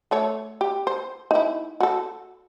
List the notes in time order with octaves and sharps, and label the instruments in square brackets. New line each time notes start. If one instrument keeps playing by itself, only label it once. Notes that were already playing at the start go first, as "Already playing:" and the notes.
[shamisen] A3 A4 C#5
G4
C5
D#4 E4
F#4 A4